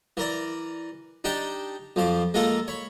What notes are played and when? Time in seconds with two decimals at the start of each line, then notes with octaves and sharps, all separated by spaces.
0.17 E3 A#4 D5
1.24 D4 D#4 G4 G5 A5
1.96 F2 F3 C5 D6
2.34 G#3 A#3 F4 A4 A#4
2.68 C#5 B5